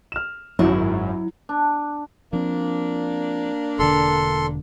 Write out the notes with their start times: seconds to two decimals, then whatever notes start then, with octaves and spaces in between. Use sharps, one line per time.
0.12 F6 E7
0.59 G#1 F#2 F#3 E4
1.49 D4
2.33 F3 A#3 C4 D4
3.79 E1 D3 A4 C6